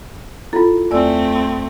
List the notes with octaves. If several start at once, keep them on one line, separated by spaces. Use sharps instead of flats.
E4 F4 A4
E2 A3 C4 D5 E6